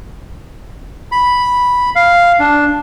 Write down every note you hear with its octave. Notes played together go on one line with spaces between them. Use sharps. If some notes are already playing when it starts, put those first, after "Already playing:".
B5
F5
D4